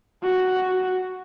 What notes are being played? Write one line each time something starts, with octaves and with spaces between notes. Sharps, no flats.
F#4